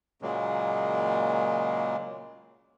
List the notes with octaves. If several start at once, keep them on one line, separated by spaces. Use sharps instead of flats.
A#2 C#3 F#3 G#3 A#3